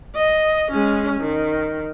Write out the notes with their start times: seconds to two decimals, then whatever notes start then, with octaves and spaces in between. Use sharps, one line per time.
0.15 D#5
0.72 G#3 C#4
1.20 D#3